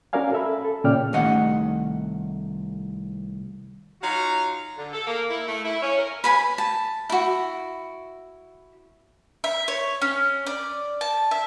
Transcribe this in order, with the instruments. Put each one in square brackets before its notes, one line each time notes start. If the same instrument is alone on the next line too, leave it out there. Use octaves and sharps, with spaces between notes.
[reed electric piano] C#4 F#4 A#4 D5 F5 G#5
A4 E5 B5
A4
A#2 C#3 C#4 D5 G5 F6
[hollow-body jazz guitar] C2 D#3 A3 D#5 F#5
[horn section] F#3 D#4 F4 F#4 F5 A#5
[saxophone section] D3
A4
A#3
E4
A3
E4
C#4
A#4
[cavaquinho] B4 G#5 B5
A5
E4 F#4
[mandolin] E5
C#5
C#4
D5
A5
E5